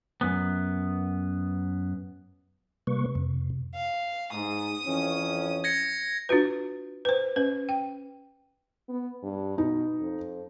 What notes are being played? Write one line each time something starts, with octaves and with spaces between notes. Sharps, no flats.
F#2 B3
C3 G3 A#3 B4 C#6
F2 C3
F5
G#2 D#6
F2 E3 C#4
G#6 A#6 C#7
D4 F4 F#4 B4
B4 C5
C#4 B4
G5
B3
G2
B2 D#4
F2